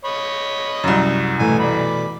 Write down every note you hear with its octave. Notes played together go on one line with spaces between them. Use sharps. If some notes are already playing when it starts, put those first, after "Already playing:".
C#5 D#5 B5
C2 F#2
B2 E3 A3 G#5
D5 B5